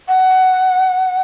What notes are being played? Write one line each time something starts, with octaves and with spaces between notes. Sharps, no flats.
F#5